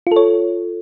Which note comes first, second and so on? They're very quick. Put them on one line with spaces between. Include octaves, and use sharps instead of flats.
F4 A4 C#5